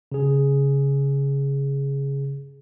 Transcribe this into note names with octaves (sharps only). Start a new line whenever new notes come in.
C#3 G#4